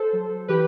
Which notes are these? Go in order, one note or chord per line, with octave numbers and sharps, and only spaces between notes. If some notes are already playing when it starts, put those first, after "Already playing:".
Already playing: A4 C5
F#3
E3 G4 B4